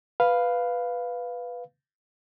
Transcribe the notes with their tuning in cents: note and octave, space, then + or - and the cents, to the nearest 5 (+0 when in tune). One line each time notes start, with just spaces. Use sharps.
B4 +0 F5 +0